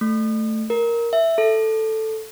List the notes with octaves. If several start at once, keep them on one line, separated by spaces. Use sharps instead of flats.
A3
A#4
E5
A4